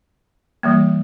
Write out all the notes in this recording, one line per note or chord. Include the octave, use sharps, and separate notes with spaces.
E3 G3 A#3